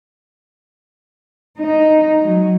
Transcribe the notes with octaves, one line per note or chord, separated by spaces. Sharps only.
D#4
F#3